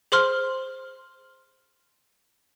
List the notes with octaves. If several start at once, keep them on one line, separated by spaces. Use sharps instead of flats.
G#4 C5 C6 F6